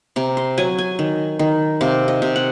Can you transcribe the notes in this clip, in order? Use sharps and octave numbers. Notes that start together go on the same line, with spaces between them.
C3 A#5
C6
F#3 G#5
G#5
D#3
D#3
C3 F5
D#5
C3
F#5